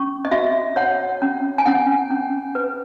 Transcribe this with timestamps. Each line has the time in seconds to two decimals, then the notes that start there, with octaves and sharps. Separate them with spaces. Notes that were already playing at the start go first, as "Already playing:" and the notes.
Already playing: C#4 C#6
0.25 D#5
0.32 F#4 E5
0.76 C#5 F#5
1.22 C#4
1.58 G#5
1.66 C#4 F#5
2.11 C#4
2.55 B4